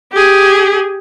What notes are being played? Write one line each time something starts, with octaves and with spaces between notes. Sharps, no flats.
G4 G#4